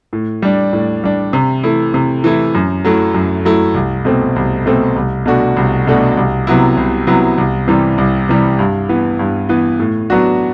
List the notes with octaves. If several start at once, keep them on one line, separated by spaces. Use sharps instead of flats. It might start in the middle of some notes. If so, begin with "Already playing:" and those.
A2
G3 D4
A2
G3 D4
C3
E3 A3 E4
C3
E3 A3 E4
F#2
F#3 A3 E4
F#2
F#3 A3 E4
C2
B2 A3 C4
C2
B2 A3 C4
C2
B2 A3 D4 F#4
C2
B2 A3 D4 F#4
C2
C3 F#3 B3 E4
C2
C3 F#3 B3 E4
C2
C3 E3 G3
C2
C3 E3 G3
G2
E3 B3
G2
E3 B3
A2
F#3 B3 D4 F#4